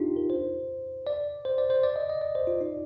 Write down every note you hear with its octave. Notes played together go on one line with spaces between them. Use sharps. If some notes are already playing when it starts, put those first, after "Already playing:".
Already playing: D4 D#4 F4 G4
A#4
C5
D5
C5
D5
C5
D5
D#5
D#5
D5
C5
F4
D#4